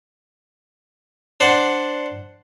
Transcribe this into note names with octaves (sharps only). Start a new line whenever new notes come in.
D4 C5 D5 F#5